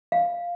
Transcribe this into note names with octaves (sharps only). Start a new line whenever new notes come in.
F5